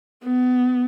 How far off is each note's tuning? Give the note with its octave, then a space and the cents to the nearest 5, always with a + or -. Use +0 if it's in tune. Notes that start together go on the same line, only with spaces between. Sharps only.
B3 +25